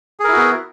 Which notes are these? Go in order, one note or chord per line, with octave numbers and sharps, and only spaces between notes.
B3 E4 F#4 G#4 A#4